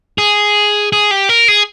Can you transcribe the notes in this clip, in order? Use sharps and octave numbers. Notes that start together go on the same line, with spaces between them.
G#4
G#4
G4
A#4
G#4